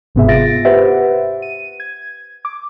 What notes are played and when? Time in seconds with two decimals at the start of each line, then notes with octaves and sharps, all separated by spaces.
0.15 G1 G#2 C3 B3 G#4 E5
0.28 F4 E5 A6 A#6 D7
0.65 G4 B4 C5 E5 F#5
1.42 D#7
1.80 G#6
2.45 D6